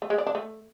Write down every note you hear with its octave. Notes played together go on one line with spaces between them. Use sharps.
A3
G#3
D5
D4
A3